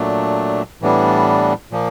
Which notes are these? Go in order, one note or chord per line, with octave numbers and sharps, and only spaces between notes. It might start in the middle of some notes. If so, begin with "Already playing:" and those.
Already playing: A#2 F#3 A3 D4
A2 E3 G3 B3 D4
A#2 F3 A#3